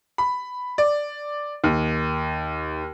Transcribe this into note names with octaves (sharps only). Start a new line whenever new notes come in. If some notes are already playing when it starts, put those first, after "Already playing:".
B5
D5
D#2